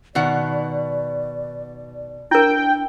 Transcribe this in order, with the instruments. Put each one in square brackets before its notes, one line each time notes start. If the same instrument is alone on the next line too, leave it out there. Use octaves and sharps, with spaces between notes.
[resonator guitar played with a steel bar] B2 D#3 F#5 [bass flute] D5
[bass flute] D4 [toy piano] E4 A#4 [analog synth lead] G5